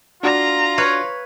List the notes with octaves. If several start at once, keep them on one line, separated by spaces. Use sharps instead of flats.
D4 F4 F#4 D5 A#5
B4 C#5 F5